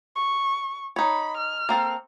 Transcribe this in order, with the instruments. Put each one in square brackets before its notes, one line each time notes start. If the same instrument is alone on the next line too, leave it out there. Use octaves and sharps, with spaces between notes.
[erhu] C#6
[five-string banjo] D#4 C#5 [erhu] B5
[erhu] F6
[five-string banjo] A#3 C4 A4